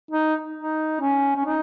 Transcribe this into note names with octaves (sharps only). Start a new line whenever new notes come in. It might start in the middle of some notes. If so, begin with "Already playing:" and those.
D#4
D#4
C#4
C#4
D#4